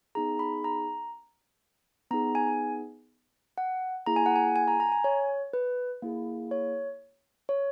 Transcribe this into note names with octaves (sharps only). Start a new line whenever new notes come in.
B3 D#4 G#4 A#5
B5
A#5
B3 D#4 G#4 A#5
G#5
F#5
A#3 E4 G#4 A#5
G#5
F#5
G#5
G#5
A#5
A#5
G#5
C#5
B4
A#3 E4 G#4
C#5
C#5